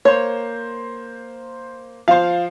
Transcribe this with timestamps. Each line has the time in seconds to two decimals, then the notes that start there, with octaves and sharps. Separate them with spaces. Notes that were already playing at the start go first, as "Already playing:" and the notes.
0.05 A#3 C5 C#5
2.08 F3 C5 F5